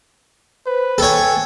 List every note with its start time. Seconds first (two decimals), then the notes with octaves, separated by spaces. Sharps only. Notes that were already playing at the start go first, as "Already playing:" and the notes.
0.67 B4 C5
0.98 A4 C#5 G5 G#5